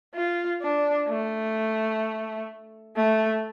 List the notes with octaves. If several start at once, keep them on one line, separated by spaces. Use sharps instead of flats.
F4
D4
A3
A3